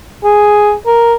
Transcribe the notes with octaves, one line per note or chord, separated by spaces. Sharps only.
G#4
A#4